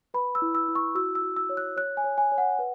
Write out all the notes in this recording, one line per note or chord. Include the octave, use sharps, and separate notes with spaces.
B4 B5
E6
E4
E6
E4
C#6
F#4 E6
E6
F#4
E6
C#5
F#6
C#5 F#6
G#5
C#5
G#5
C#5
F#5
B4